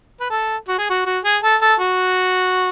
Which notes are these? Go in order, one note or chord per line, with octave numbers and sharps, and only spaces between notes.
B4
A4
F#4
G#4
F#4
F#4
G#4
A4
A4
F#4